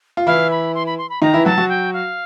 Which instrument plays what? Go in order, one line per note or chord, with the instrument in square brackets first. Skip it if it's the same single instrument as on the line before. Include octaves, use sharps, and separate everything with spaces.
[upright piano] F4
[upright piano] E3 E4 [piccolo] F5
[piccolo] B5
C6
B5
C6
B5
[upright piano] D#3 D#4 [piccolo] A#5
[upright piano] E3 E4
[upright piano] F#3 F#4 [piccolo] A5
[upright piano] F#3 F#4
[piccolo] G5
F5